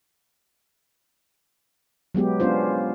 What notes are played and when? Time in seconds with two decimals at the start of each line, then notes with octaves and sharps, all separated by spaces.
2.15 F#3 G#3 B3 G4
2.40 B3 C#4 D4 F4 C5